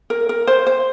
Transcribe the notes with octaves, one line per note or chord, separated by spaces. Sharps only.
A#4
A#4
C5
C5